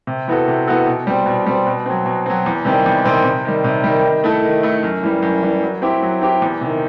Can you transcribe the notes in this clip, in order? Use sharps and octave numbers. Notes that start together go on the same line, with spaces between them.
C3
E3 B3 F#4 A4
C3
E3 B3 F#4 A4
B2
G3 C4
B2
G3 C4
B2
F#3 C4
B2
F#3 C4
E2
C3 D#3 G3 C4
E2
C3 D#3 G3 C4
C3
D#3 G3
C3
D#3 G3
D#3
A3 E4 A4
D#3
A3 E4 A4
F#2
E3 G3
F#2
E3 G3
F#3
C4 E4 G4
F#3
C4 E4 G4
E2
C3 D#3